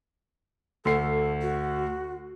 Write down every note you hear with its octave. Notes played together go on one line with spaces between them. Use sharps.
D2 A4 C7
F#4